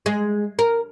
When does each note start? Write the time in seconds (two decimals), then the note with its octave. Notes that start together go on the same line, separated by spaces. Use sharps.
0.06 G#3
0.59 A#4